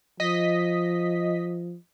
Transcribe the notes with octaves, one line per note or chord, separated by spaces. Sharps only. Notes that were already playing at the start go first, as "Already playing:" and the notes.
F3 D#5 B6